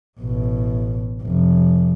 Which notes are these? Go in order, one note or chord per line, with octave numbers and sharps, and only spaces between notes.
A1 B2
F1